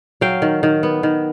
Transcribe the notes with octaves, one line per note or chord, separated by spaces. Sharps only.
F#3 F5 G5
D#3
D#3
B3
D#3